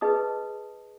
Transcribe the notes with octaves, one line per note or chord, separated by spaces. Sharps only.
D#4 G#4 B4 D#5 D#6